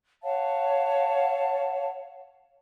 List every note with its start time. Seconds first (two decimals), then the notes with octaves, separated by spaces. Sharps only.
0.23 C#5 F5 F#5 A5